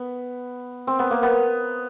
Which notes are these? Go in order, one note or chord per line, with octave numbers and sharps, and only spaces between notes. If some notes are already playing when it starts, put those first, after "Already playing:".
Already playing: B3
C4
B3
A#3
B3